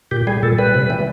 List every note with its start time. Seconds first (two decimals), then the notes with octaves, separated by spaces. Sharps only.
0.11 A#2 G4
0.27 G3 G#4
0.43 A#2 A4
0.58 G3 B4
0.74 C3
0.90 E3 G3